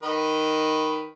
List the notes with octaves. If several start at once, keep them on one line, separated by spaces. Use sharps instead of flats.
D#3 B4 D#5